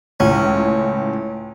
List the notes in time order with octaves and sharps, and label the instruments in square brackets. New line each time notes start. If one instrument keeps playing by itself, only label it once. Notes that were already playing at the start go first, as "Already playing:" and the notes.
[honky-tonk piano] C#2 A2 [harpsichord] C#4